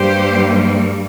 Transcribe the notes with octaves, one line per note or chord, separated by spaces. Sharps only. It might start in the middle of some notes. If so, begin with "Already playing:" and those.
Already playing: G2 G3 A#3 G4 C5